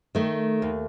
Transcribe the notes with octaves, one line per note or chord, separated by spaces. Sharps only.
D#3 A3
D#2